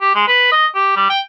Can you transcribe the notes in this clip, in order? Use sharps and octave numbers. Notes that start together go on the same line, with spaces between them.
G4
G#3
B4
D#5
G4
G3
G5